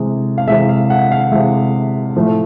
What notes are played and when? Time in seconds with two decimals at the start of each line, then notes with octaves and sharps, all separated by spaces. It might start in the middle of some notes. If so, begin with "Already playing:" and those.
Already playing: C3 E3 G#3
0.38 F5
0.48 C3 E3 G#3 E5
0.69 F5
0.90 F#5
1.11 F5
1.32 C3 E3 G#3 E5
2.16 A2 F3 A3